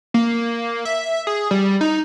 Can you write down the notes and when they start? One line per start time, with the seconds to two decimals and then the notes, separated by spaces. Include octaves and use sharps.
0.14 A#3
0.85 E5
1.27 G#4
1.51 G3
1.81 D#4